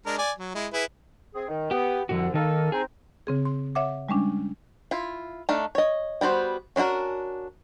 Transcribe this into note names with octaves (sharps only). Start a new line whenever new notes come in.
G#3 D4 A#4
D5 G#5
F#3
G#3 E4
E4 G#4 B4
C4 G#4
D#3
B3 G4
C2 F2 G#2 D3 F#4
D#3 A#3 D#4 A4 A#4
C4 D#4 G#4
C#3 C4 G#4
C6
C#5 E5 F#5 D6
G3 G#3 C#4 D4
E4 F4
A3 D4 D#4 F5
C#5 D#5
G3 B3 F#4 C5
C#4 D4 E4 F#4 A#4